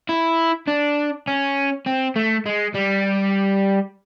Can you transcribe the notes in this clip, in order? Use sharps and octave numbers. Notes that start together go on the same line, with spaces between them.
E4
D4
C#4
C4
A3
G#3
G3